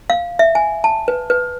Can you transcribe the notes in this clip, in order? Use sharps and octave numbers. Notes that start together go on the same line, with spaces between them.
F5
E5
G#5
A5
B4
B4